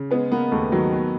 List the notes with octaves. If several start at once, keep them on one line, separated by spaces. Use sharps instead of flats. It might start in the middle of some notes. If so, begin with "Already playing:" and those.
Already playing: C#3
G#3 B3
A#3 B3
D#2 A3
D#3 F#3
B3